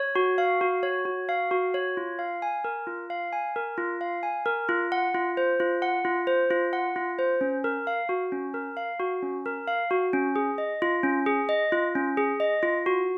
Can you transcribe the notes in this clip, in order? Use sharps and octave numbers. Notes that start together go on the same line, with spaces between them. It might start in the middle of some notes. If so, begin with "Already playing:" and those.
Already playing: C#5
F#4
F5
F#4
C#5
F#4
F5
F#4
C#5
F4
F5
G#5
A#4
F4
F5
G#5
A#4
F4
F5
G#5
A#4
F4
F#5
F4
C5
F4
F#5
F4
C5
F4
F#5
F4
C5
C#4
A#4
F5
F#4
C#4
A#4
F5
F#4
C#4
A#4
F5
F#4
C#4
G#4
D#5
F4
C#4
G#4
D#5
F4
C#4
G#4
D#5
F4
F#4